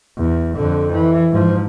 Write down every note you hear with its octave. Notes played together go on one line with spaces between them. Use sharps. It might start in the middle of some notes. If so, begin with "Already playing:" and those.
E2
F2 D3
E3
G#2 F3